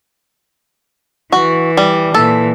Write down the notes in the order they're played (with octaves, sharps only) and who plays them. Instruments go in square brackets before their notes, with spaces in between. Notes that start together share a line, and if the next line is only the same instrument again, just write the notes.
[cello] E3 [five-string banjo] F#4
[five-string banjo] G3
[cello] A#2 E3 [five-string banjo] A4